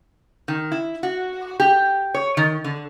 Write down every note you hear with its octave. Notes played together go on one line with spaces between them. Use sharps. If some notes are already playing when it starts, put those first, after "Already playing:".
D#3
E4
F#4
G4
C#5
D#3
D3